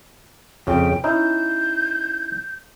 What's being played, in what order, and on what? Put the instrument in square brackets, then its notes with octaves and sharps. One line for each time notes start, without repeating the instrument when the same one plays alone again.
[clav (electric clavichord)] F2 C#3 C#4 [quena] G5
[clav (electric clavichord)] C#4 D#4 E4 [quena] G6